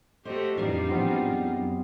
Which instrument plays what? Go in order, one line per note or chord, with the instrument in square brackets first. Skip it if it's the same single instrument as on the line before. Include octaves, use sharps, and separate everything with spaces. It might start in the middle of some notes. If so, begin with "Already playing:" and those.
[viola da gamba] A3 F#4 G4 [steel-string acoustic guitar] C5 D#5
[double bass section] F2 A2 E3 [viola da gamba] G3 D#4 F4 [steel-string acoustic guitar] D4 G#4
[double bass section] A2 E3 F3 [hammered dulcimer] B3 C4 F#5
[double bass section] F#2